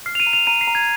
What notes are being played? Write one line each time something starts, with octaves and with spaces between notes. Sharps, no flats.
F6 C7
F7
D#7
A#5
F7
A#5 D#7
C7
A#5
G#6